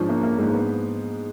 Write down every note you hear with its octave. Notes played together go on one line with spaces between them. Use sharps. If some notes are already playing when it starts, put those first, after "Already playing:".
Already playing: G#2 F3 C#4 D4
A#3
A#3
G#2
B3